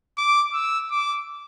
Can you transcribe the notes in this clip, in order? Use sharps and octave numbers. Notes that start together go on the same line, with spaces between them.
D6
E6
D6